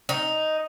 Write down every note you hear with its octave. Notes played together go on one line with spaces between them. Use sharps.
D#4